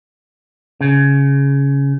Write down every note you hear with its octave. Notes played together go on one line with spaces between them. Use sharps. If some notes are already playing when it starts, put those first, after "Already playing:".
C#3